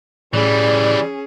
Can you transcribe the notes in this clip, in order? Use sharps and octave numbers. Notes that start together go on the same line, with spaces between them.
A2 E3 G3 C#4 G#4 D5